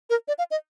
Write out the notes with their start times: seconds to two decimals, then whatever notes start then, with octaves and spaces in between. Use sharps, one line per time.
0.10 A#4
0.28 D5
0.38 F5
0.51 D#5